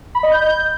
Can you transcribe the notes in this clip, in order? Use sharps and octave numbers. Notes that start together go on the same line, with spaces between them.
B5
D#5
G6